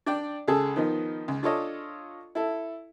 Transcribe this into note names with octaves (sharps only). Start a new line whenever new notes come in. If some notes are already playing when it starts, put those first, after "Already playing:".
D4 D5 G5
C#2 C#3 G#4 A4
D#3 F3 B3 D#4
C#2
D4 F4 A4 C#5 D#5
E4 A4